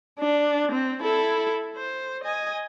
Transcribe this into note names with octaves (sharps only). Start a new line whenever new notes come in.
D4
C4
E4 A4
C5
D#5 G#5